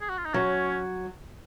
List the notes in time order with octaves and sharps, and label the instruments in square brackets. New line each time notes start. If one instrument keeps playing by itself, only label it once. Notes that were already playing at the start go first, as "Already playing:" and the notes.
[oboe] G#4
F#4
F4
D#4
[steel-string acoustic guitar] F#3 [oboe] C#4